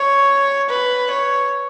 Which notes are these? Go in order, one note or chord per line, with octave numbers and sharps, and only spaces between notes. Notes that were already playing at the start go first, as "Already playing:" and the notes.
Already playing: C#5
B4
C#5